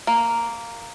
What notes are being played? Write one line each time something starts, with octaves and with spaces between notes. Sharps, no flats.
A#3